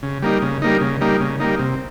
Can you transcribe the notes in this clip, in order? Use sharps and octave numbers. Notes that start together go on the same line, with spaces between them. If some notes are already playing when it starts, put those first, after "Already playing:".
C#3
G3 A#3 D#4
C#3
G3 A#3 D#4
C#3
G3 A#3 D#4
C#3
G3 A#3 D#4
C3